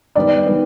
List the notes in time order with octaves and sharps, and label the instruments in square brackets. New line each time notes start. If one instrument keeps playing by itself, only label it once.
[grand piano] D#3 G3 B3 [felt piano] D5
[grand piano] D#3 G3 B3